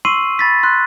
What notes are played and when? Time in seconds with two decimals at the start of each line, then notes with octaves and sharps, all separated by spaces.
0.05 C6 C#6 E6 C7 D#7 F#7
0.39 B5 A6 B6
0.63 C6 F#6